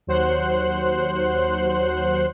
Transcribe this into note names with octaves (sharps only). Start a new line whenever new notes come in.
D#2 F#3 C5 F#5 C6 F#6